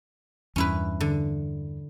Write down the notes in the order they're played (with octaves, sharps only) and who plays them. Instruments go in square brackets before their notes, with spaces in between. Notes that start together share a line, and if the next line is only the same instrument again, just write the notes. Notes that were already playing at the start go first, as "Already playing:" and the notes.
[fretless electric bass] E2 G2 [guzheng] C#4 E4 B4
[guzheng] D3